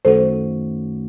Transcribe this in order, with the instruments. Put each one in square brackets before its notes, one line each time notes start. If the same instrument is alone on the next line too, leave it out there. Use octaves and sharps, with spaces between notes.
[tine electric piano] F#2 D#3 A3 C#4 F#4 [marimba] A4 C5